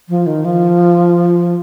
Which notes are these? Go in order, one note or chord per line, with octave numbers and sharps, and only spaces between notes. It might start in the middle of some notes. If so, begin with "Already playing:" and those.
F3
D#3
F3